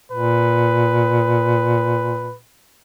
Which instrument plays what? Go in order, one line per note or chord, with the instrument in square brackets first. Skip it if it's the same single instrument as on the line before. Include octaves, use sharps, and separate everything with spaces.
[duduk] A#2 [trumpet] B4